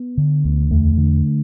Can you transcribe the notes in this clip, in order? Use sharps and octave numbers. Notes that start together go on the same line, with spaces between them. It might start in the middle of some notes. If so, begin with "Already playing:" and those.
Already playing: B3
D3
D2
E2 A3
D3